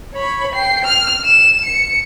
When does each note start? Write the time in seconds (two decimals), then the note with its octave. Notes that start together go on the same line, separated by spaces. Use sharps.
0.14 C#5 B5
0.55 G5 C7
0.85 F6
1.25 E7
1.65 C#7